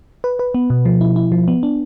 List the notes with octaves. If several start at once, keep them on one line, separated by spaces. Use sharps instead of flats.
B4
B4
B3
B2
F3
E4
E4
F3
B3
D4